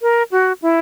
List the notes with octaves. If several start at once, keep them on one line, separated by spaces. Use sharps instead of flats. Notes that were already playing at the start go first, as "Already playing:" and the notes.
A#4
F#4
E4